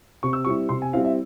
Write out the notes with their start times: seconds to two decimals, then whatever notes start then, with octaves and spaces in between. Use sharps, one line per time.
0.23 C3 C#6
0.33 E6
0.45 G3 C4 E4 C#6
0.69 C3 C6
0.82 G#5
0.93 G3 C4 E4 F5
1.05 E5